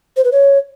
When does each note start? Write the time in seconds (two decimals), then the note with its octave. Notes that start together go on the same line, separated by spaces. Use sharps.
0.17 C5
0.24 B4
0.32 C#5